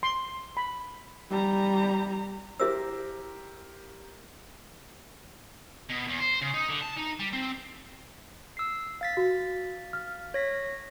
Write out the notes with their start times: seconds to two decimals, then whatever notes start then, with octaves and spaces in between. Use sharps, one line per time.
0.03 C6
0.57 B5
1.30 G3 A#5
2.60 E4 G4 A#4 C5 E5 E6
5.89 B2
6.07 E2
6.20 C5
6.41 C#3
6.54 D#4
6.70 D3
6.83 A5
6.97 D#4
7.19 G3
7.33 C4
8.57 E6 C7
9.01 F5 A6 B6
9.17 F#4
9.93 F6
10.34 C#5 A#6 B6